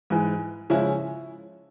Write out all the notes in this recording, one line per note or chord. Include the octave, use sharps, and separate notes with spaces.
G#2 E3 G#3
C#3 F3 G#3 C#4 E4